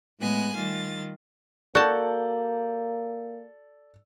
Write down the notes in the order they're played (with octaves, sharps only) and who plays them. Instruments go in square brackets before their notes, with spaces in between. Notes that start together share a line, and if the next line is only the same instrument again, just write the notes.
[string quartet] A2 G#3 A3 B3 G#5 F#6
D#3 G3 F4 A6
[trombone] A#3 [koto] F#4 A5 [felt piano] A4 D5 G6